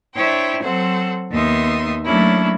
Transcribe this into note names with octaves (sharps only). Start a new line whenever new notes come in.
D4 E4 C5 C#5 G5
F#3 C4 A4 C5 F#5
D#2 B3 D#4 E5 C6 D#6
F#3 A3 A#3 C#4 D4 E4